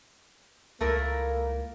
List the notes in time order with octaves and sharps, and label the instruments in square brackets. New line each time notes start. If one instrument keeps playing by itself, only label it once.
[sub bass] C#2 [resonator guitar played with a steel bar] A3 E4 A#4 [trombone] A#3